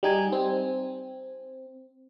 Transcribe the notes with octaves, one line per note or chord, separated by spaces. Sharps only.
G3 D#4 G#5
C4